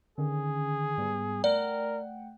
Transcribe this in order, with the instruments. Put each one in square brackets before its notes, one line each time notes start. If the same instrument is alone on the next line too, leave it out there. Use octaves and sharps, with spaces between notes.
[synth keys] D3 D#3 C#4 [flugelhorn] G#4
[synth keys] G#2 G3 B3
[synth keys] A3 F#5 G5 [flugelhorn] A#4 [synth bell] D5